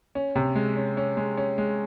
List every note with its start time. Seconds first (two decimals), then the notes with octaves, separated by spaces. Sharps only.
0.15 C#4
0.35 C3
0.56 G#3
0.77 C#4
0.97 C#4
1.17 G#3
1.37 C#4
1.58 G#3